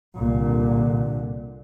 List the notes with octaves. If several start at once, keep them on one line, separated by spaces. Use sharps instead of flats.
C2 A#2 D3